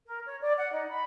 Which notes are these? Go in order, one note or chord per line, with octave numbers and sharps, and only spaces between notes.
A#4
C#5
D5
F#5
D#4
B5